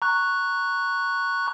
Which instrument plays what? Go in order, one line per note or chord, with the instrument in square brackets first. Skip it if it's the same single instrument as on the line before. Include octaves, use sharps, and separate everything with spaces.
[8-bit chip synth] A#5 C#6 F#6